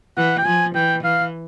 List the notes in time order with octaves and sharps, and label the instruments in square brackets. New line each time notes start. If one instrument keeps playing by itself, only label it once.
[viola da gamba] E3 [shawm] F#5
[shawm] G5
[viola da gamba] F3 [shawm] G#5
[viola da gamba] E3 [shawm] G5
[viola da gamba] E3 [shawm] F5